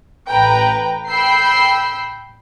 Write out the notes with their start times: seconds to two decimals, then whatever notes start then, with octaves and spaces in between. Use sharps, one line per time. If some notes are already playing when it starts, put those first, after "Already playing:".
0.29 A1 B4 G5 A#5
1.08 G5 B5 E6 G6 C7